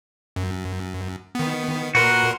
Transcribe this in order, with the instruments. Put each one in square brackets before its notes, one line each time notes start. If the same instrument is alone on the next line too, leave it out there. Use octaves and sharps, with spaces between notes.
[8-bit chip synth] F#2
D#3 B3
[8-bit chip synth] A#2 A#4 C6 [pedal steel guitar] F#4 B4